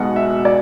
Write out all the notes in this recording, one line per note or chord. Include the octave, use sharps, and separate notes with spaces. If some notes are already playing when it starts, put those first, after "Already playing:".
Already playing: B1 B2 G#3 F#5
E5
D5